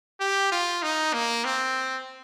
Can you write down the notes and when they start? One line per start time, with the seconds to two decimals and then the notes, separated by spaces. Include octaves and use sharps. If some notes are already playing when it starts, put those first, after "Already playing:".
0.20 G4
0.52 F4
0.82 D#4
1.13 A#3
1.45 C4